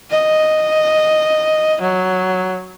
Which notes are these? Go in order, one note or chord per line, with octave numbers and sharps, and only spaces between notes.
D#5
F#3